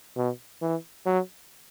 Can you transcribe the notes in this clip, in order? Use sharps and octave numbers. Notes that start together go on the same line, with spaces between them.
B2
E3
F#3